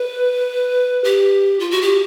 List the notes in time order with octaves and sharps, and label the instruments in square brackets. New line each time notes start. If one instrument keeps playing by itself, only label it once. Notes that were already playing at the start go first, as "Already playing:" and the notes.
Already playing: [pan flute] B4
G4
F4
F#4
G4